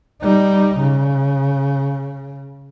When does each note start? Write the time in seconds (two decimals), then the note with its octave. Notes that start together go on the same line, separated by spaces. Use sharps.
0.22 G3 D#4
0.79 C#3